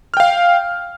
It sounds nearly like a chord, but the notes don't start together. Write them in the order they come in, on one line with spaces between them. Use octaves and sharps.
F6 G5 F5